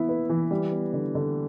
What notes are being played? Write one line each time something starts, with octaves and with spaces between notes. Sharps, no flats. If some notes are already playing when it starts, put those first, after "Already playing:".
Already playing: E3 B3 E4
B4
E3
G3
B3
D3
D3